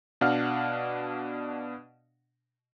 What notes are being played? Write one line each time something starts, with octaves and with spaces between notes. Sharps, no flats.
B2 D4 F5 F#5 F6